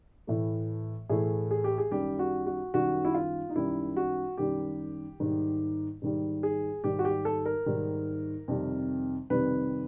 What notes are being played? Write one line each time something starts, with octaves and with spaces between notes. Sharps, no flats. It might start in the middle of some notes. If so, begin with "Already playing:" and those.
A2 E3 A3
A2 E3 A3 G#4
G#4
G4
G#4
F#2 D#3 G3 G4
F#4
F#4
F#2 D#3 G3 F#4
E4
F4
D#4
F#2 D#3 G3 E4
F#4
F#2 D#3 G3 G4
G#2 D#3 G3
G#2 D#3 G3
G#4
G#2 D#3 G3 G4
F#4
G4
A4
A#4
G#2 D#3 G3
F2 C3 D#3 G3
F2 C3 D#3 G3 B4